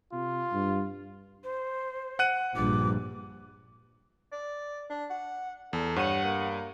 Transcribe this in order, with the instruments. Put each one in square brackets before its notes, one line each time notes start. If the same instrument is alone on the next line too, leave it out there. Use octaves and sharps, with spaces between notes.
[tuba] C3 [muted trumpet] F4
[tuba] G2
[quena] C5
[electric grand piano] F#5 F#6 D#7
[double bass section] A#1 G2 [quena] D6
[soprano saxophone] D5
D4
F#5
[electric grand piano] E2 [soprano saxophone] A4
[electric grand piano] G2 D#7 [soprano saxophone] C#5 [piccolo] F#5
[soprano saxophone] A#3